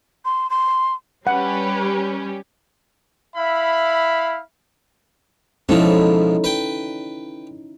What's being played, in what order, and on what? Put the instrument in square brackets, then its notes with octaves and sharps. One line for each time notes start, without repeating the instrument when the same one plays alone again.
[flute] C6
C6
[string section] G3 C#4 G4 [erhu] B4 [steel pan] F#5
[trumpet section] E4 F5 B5 [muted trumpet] E5
[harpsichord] G#2 B2 F3 [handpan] C#4 D#4 E4 [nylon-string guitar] A4
[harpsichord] B4 G5